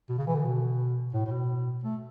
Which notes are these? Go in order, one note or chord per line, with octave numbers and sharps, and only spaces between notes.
B2
C#3
E3
D3
B2
A2
A2
B2
A3